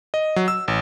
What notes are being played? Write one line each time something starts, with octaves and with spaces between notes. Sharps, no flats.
D#5
F#3
E6
A1